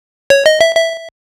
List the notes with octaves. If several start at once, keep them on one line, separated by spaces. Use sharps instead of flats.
C#5
D#5
E5
E5